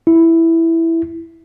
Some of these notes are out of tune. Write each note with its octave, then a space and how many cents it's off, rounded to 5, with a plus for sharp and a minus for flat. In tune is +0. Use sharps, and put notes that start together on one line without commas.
E4 +0